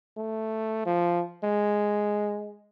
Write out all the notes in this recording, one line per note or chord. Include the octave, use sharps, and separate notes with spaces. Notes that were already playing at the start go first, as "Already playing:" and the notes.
A3
F3
G#3